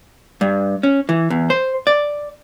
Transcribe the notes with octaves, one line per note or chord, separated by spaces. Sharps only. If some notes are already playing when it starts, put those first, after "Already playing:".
G2
C#4
E3
E2
C5
D5